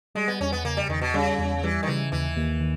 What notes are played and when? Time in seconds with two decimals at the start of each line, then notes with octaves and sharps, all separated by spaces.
0.15 G3 G#3
0.28 B3
0.40 E2 C#4
0.52 B3
0.64 C#3 A#3
0.77 G3
0.89 E2 D#3
1.01 B2
1.14 C#3 G3
1.38 E2
1.63 E3 G3
1.83 D#3
1.87 C#3 E3
2.12 D#2 E3
2.36 D#2
2.61 D#3